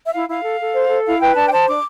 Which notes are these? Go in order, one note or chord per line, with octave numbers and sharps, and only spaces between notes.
E5
E4 F5
E4 F5
A4
A4
C5
A4
E4 F5
B4 G5
D4 A5
G5
C5 A5
D4 D6